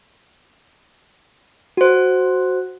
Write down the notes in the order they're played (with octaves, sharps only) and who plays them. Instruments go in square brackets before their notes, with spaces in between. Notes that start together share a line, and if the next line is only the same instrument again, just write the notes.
[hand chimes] F#4 C5